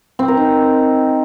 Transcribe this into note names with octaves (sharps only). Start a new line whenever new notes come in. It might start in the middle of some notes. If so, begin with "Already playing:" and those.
C4
A#4
D#4